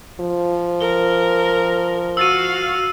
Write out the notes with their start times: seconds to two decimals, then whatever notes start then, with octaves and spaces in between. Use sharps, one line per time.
0.20 F3
0.80 A#4 G7
2.17 F#4 F5 E6 A6 D#7